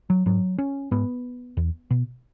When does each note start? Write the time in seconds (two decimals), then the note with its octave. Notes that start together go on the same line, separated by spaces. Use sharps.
0.10 F#3
0.26 G#2 F#3
0.58 C#4
0.91 G#2 B3
1.57 E2
1.90 B2